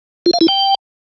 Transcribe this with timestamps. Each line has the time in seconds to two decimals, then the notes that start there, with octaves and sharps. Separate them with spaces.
0.26 F4
0.33 F5
0.41 E4
0.48 G5